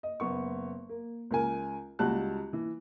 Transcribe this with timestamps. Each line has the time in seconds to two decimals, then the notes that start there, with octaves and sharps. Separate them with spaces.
0.03 D#5
0.20 F#1 B3 C#6
0.89 A#3
1.31 C#2 A#4 G#5
1.99 C#2 G3 F#4 A5 F#6
2.53 E3